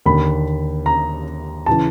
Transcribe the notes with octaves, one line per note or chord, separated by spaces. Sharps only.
D#2 D3 B5
A#5
C#3 E3 A5